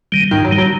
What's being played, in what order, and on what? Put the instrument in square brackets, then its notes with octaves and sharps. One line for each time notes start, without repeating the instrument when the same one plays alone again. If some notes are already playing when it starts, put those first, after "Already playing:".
[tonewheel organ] D#3 G3
[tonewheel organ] G#2 [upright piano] D#3
[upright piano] F#3
[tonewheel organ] D#3 G3
[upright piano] F#3